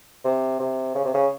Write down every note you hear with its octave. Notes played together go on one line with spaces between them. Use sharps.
C3
C3
C#3
C3
C#3